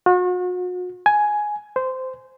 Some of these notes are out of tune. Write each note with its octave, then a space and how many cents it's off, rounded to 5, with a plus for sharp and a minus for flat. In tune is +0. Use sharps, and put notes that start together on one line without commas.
F#4 -40
G#5 +10
C5 -15